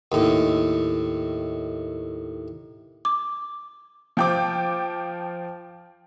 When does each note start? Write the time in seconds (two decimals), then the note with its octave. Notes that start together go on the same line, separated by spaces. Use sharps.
0.12 D#2 A2
3.05 D6
4.17 F3 G5 D6